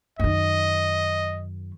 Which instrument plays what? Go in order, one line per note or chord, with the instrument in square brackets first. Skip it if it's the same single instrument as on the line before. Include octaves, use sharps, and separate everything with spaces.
[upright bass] F#2 D#3 [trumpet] D#5